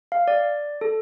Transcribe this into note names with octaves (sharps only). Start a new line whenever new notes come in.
F5
D5
A4